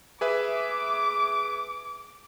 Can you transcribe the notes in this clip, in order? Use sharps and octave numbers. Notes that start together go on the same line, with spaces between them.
G#4 B4 E5 D6